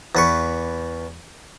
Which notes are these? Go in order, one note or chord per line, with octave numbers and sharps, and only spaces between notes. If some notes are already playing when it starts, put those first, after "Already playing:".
E2 B4 C#6